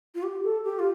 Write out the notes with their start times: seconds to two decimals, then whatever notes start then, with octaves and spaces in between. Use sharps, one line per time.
0.15 F4
0.23 G4
0.44 A4
0.64 G4
0.79 F4